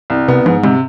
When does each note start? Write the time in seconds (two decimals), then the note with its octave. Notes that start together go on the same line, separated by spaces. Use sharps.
0.10 C2
0.28 C3 B3
0.46 G#2 F3
0.63 C3 G#3